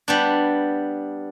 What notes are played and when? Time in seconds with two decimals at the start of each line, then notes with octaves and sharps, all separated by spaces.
0.08 G3 B3 D4